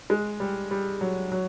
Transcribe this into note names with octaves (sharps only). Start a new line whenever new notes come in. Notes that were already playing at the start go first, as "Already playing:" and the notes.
G#3
G3
G3
F#3
F#3